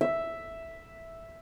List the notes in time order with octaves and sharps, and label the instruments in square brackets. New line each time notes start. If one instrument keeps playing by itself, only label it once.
[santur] E5